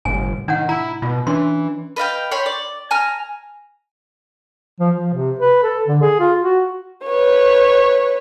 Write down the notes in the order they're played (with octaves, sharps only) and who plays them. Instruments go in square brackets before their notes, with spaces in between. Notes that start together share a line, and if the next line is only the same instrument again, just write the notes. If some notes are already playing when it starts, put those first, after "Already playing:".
[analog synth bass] G1 [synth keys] A2 C3 [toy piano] G#5
[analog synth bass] D#3 [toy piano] D4 C#5 F#5
[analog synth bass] E4 [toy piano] A#5
[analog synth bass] B2 [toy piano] F4
[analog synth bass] E3 [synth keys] C#4 D4 B4 [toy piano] C6
[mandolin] B4 D#5 F5 G5
C#5 G5 B5 C6
D5
G#5 A#5 F6
[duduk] F3
F3
C3
B4
A4
D3
G#4
F4
F#4
[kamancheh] B4 C#5